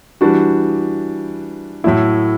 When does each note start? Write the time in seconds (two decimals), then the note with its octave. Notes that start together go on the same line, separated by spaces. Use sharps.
0.21 E3 G3 D4 F#4
1.84 A2 F#3 A3 E4